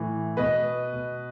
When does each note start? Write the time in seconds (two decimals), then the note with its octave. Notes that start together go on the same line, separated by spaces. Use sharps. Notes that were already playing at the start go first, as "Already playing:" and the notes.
Already playing: A2 E3
0.37 B2 B4 D#5
0.93 B2